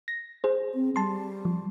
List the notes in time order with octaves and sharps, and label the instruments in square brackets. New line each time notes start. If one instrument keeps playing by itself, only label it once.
[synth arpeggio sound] A#6
G#4 C5
[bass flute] C4
[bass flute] G3 [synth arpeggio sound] A5 C6
[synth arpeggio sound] F3